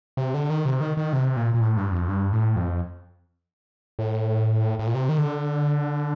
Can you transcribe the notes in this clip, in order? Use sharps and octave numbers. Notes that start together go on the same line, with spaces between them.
C3
D3
D#3
C3
D#3
D#3
C3
A#2
A#2
A2
G2
F2
G2
A2
F2
A2
A2
A#2
C3
D#3
D3